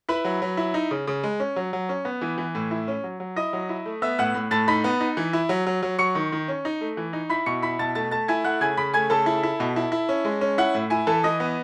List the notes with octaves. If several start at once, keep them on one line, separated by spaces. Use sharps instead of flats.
E4 B4 B5
F#3
F#3
E4
D#4
C#3
C#3
G#3
C#4
F#3
F#3
C#4
B3
E3
E3
A2
E4
C#4
F#3
F#3
E4 D#5 D#6
F#3
E4
A3
B3 E5 E6
A2 F#5 F#6
A2
A2 A5 A6
D#4 B5 B6
B3
D#4
E3
E4
F#3
F#3
F#3
F#3 C#6 C#7
D#3
D#3
C#4
D#4
A3
E3
D#4
E4 B5 B6
B2 C#6 C#7
E4 B5 B6
B2 A5 A6
A3 A5 A6
A3 A5 A6
E4 G#5 G#6
A3 F#5 F#6
C#3 G#5 G#6
C#3 B5 B6
A3 G#5 G#6
C#3 A4 A5
E4
E4
B2
E4
E4
C#4
G#3
C#4
E4 F#5
A2
E4 G#5
E3 A4 A5
E3 D#5 D#6
B3